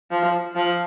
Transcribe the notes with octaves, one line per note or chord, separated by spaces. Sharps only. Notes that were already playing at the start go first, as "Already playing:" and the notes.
F3
F3